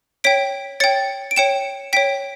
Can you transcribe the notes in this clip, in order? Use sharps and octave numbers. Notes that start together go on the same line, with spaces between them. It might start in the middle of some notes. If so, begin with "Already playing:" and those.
C#5 G5 B6 D7
C#5 G5 A6 C#7
D7
C#5 G5 C#7 E7
C#5 G5 B6 D7